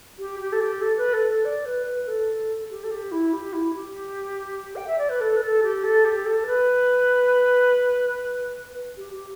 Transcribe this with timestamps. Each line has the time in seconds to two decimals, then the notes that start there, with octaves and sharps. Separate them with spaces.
0.19 G4
0.40 G4
0.52 A4
0.61 G4
0.82 A4
0.97 B4
1.13 A4
1.29 A4
1.45 D5
1.65 B4
1.86 B4
2.07 A4
2.70 G4
2.84 A4
2.91 G4
3.12 E4
3.33 G4
3.53 E4
3.74 G4
4.76 G5
4.87 E5
4.98 D5
5.10 B4
5.21 A4
5.37 B4
5.42 A4
5.63 G4
5.84 A4
6.05 G4
6.25 A4
6.46 B4
8.97 G4
9.13 G4